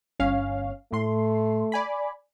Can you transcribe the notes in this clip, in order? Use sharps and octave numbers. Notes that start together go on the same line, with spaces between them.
G1 C#4 F5
A2 A3 C6
D5 G#5 B5